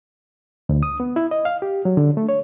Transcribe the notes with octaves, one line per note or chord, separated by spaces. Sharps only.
D2
D#6
B3
E4
D#5
F5
G4
F#3
D3
A3
C#5